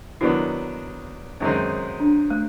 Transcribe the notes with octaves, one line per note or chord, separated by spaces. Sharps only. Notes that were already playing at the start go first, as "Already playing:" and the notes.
D#3 F#3 B3 D4 E4
F#2 D#3 G#3 C4 D#4
D4
A3